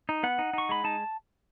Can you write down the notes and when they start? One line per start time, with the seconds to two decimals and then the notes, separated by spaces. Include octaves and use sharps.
0.09 D#4
0.23 B3 F#5
0.39 D#4
0.53 D#4 C#6
0.69 G#3 B5
0.84 D#4 A5